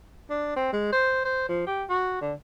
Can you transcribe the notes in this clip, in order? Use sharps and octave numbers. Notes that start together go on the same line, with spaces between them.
D4
C4
G#3
C5
C5
F3
G4
F#4
D3